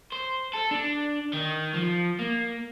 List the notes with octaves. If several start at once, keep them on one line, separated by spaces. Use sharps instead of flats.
C5
A4
D4
D#3
F3
A#3